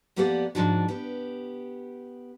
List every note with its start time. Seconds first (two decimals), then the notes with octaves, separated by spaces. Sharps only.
0.16 F2 A#3 B3 G4 D5 F#5
0.55 G#2 C#3 F3 D4 D#4 F#4
0.88 B3 G4